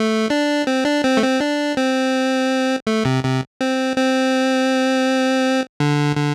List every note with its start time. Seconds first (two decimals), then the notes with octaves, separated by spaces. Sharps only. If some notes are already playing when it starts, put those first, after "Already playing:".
Already playing: A3
0.30 D4
0.67 C4
0.85 D4
1.04 C4
1.17 A3
1.23 C4
1.40 D4
1.77 C4
2.87 A3
3.05 C3
3.24 C3
3.61 C4
3.97 C4
5.80 D3
6.16 D3